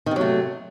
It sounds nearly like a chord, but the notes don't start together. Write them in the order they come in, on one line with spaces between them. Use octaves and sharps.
D#3 C3 F#3 A3